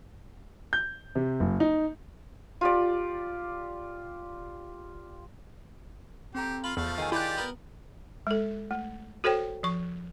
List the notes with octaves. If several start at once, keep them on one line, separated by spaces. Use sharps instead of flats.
G6
C3
F#1
D#4
F4 G4 D5
C4 G4 A4 A#5
F4 F5 B5
E2 F3 A3 F5
D#3 G#4 G#5
E4 F4 G4 D5 F#6
B3 A#4
G#3 A4
A3
F#4 A4 C5 C#5 G5
F3 C#6